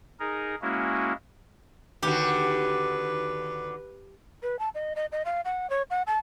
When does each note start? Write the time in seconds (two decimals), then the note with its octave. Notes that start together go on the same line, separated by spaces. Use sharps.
0.20 D#4 G#4 A#4
0.62 G#3 A#3 C#4 E4 F#4
2.03 D#2 D3 F#4 G4 B4
4.43 B4
4.59 A5
4.75 D#5
4.96 D#5
5.12 D#5
5.25 F5
5.45 F#5
5.70 C#5
5.90 F#5
6.07 A5